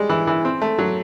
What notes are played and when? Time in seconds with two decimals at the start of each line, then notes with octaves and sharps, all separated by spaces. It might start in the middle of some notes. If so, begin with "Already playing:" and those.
Already playing: G3 G#3
0.09 E3
0.27 E3
0.45 C4
0.62 A3
0.79 F#3